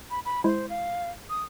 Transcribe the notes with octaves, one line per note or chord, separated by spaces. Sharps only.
B5
B5
G#3 E4 C5
F5
D#6